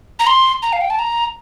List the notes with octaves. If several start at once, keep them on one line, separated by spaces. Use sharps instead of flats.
A#5
C6
A#5
F5
G5
A5
A#5